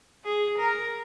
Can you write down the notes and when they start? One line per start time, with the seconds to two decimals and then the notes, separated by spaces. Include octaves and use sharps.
0.24 G#4
0.58 A#4